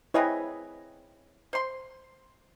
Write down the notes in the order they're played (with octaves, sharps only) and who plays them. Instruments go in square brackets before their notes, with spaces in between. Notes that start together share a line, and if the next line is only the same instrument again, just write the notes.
[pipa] C4 G#4 C#5 [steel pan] E4 B4 D#5
[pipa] C5 C6